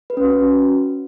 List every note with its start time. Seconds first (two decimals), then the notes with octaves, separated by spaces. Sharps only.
0.10 B4
0.17 C#4
0.24 F#4
0.31 C#4